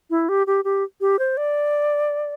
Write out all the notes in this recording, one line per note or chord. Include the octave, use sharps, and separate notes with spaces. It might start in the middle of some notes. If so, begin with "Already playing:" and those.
E4
G4
G4
G4
G4
C5
D5